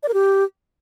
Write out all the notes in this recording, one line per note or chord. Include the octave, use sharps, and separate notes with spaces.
D5
A#4
G4